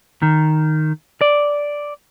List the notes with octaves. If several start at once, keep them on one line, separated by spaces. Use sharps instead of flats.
D#3
D5